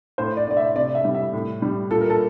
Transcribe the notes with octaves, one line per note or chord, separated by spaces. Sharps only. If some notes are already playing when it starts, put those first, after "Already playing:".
A2 C5
D5
A2 D5
E5
C3 D5
E5
G3
E5
A2
G3
A#2 A4
A#4
A4